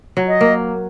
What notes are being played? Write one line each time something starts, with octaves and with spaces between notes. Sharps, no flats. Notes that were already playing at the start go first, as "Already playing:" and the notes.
F#3
D#5
A#3